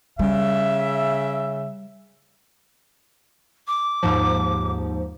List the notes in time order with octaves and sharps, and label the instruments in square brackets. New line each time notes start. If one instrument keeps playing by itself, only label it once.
[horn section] C#3 E5 [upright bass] G3
[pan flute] D6
[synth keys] D#2 G#2 F3